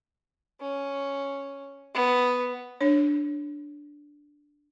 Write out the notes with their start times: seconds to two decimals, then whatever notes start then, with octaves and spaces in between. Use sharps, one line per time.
0.60 C#4
1.94 B3
2.81 D4 C#5